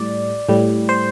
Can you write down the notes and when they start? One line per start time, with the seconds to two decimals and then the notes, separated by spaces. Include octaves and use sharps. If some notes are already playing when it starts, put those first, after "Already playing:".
Already playing: A2 G3 D5
0.49 A2 G3
0.89 C5